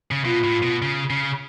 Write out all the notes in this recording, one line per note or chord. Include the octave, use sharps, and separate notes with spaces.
C#3
B2 F4
A2
B2
C#3
C#3